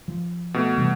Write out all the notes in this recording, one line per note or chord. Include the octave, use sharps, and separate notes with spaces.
F3
B2 A3
C3 E3 G3